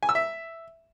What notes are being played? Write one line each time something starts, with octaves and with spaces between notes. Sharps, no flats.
G#5
E6
E5